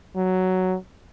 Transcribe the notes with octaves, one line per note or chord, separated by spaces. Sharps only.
F#3